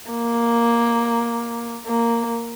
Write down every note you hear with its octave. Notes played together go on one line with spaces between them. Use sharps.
A#3
A#3